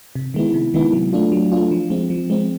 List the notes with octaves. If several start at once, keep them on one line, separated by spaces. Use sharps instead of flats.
C3
D#3 G#3 B3 E4
C3
D#3 G#3 B3 E4
F#3
A3 D4 F4
F#3
A3 D4 F4
F3
G#3 C4
F3
G#3 C4